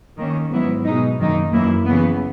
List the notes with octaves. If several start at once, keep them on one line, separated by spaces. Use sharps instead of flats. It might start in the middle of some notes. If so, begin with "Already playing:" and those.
D#3 A#3 C#4
G#2 F#3 B3 E4
B2 G#3 D#4
F#2 D#3 A#3 D#4
F#2 E3 A#3 E4
C#3 E3 B3